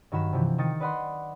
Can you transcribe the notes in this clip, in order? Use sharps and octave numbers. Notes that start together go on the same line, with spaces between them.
G2 D#3 F#3 F#4 B5 E7
C3 E3 F3
D#3 G5 D#6 A6 C#7
B4 D5 D#5 F#5 B5 C6